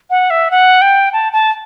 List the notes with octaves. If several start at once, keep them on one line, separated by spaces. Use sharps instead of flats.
F#5
E5
F#5
G5
A5
A5